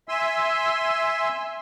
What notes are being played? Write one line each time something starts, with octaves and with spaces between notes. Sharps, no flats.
E5 G#5 C6 E6